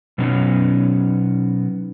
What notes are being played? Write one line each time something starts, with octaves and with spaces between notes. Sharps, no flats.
B2 F#3 B3 C#4 D#4